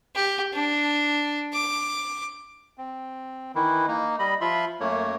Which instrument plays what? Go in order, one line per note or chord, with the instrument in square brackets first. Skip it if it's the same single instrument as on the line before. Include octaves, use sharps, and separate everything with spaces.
[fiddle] G4
D4
D6
[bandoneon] C4
D#3 E3 E4
A#3 D#4
G3 D#5 B5
F3 F4 E5 B5 C6
F#2 A3 A#3 C#5